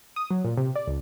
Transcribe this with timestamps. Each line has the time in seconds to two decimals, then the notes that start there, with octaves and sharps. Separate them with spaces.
0.16 D#6
0.31 F#3
0.45 A#2
0.57 C3
0.76 D5
0.88 C#2